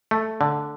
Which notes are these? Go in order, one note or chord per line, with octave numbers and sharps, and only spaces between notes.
A3
D3